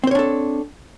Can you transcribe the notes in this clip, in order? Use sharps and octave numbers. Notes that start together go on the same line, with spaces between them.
C4 D4 A4 C5 C#5